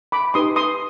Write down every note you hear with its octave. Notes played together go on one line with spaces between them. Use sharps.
B5 D6
D#4 G4 B4 C6 D#6
C6 D#6